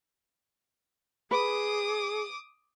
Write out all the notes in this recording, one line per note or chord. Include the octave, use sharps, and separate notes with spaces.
G#4 B4 D6 D#6